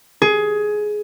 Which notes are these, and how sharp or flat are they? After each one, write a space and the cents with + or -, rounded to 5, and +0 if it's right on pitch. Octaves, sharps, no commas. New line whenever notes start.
G#4 +15